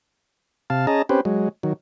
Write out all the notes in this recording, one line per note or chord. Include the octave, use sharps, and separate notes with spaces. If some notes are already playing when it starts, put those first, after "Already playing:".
C3 F5 A5
C#4 G#4 D#5 A5 A#5
C4 C#4 G4 B4 C5
F#3 G#3
D#3 F#3